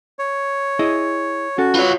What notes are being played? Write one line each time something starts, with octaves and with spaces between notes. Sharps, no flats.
C#5
E4 G#4 D#5
C#4 F#4 A4
F4 B4 C#5